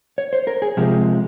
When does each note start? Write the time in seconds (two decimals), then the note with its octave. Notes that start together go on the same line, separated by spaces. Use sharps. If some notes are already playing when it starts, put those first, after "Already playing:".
0.18 C#5
0.33 C5
0.47 A#4
0.62 G#4
0.77 C3 F3 G#3 G4